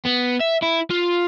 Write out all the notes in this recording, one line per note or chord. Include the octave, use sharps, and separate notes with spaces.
B3
E5
E4
F4